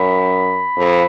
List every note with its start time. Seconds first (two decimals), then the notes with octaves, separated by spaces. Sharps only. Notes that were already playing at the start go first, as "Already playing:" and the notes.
Already playing: F#2 B5
0.77 F2